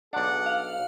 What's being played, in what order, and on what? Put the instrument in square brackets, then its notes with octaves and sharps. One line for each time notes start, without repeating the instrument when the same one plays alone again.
[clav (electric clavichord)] B1 D4 [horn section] G#4 D5 F#5
[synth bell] F5